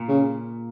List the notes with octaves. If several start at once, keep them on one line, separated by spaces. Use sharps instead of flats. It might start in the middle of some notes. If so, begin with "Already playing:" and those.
Already playing: A#2
C#3